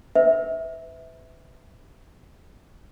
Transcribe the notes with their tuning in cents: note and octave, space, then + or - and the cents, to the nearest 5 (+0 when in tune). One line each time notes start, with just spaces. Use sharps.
B4 +35 E5 -15